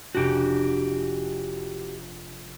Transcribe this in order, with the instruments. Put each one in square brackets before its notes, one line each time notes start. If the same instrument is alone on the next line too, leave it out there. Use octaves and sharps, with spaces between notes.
[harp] F1 D4 [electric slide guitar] F#4 G4